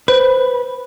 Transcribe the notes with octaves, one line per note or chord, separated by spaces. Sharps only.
B4 C5